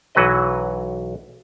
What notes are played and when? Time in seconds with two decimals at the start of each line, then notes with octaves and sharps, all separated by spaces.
0.15 B1 E3 F#3 F#4 B4 D#5